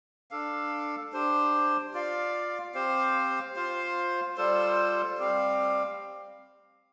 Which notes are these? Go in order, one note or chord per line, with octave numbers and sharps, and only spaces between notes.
D4 A4 F5
D4 G4 C5
F4 D5 F5
C4 G4 C5 F5
F4 C5 F5
G3 F4 A4 C5
G3 C4 G4 F5